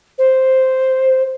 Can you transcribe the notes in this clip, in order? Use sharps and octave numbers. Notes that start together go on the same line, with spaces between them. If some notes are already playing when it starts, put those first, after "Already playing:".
C5